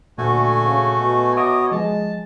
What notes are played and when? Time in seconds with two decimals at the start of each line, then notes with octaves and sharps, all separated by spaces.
0.18 D2 A#2 A3 F#4 G#5
0.64 C#3
0.99 B2
1.37 C#5 D#5 E5 D6 D#6
1.72 F3 G#3 A5